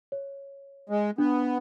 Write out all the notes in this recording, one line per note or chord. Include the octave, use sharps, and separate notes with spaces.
C#5
G#3
B3 D4